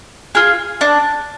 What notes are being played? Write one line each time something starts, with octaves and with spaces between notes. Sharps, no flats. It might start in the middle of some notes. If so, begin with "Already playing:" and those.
F4 G#4
D4